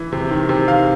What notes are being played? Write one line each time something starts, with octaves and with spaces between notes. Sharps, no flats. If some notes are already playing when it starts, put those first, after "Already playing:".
Already playing: E3
C3
D#3
C3
D#3 F5